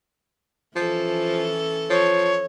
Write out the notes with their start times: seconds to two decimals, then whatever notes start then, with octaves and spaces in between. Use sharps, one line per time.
0.76 E3 F3 C#4 A4
1.90 F3 C#5